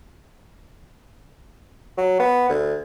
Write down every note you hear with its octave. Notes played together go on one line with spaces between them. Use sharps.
F#3
B3
D2